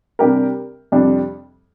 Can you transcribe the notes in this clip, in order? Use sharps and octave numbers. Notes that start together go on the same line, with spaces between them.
C3 G3 D4 G4 A#4
F2 C3 G3 D4